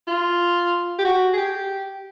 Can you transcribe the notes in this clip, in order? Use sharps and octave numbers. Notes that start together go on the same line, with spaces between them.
F4
G4
F#4
G#4
G4